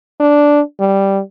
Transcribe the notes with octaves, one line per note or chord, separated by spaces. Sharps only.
D4
G3